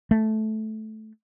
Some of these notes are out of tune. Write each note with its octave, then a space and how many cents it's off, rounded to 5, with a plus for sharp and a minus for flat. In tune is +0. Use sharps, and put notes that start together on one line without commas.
A3 -15